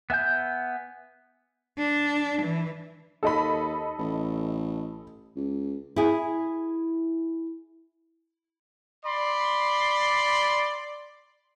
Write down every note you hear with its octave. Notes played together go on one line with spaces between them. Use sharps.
B3 E5 G#5 G6
D4
E3
D#2 A4 D#5 B5
A1
C#2
E4 G#4
D5 B5 C6